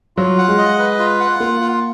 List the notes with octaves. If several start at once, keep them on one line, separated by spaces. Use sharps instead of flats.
F#3 F4
F#5
G#3
D#5
B4
F4
F#5
A#3 F4
F4